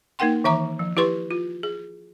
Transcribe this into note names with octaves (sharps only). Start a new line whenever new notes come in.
A#3 D#4 A#4 F#5 G5 C6
D#3 E3 E5 A#5 D6
F3
E4 G4 B4 C6 C#6
F4
G#4